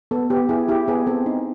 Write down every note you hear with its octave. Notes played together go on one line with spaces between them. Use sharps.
B3 A4
B3 G4
E4 G#4
E4 G4
B3 G#4
C4 A4
D#4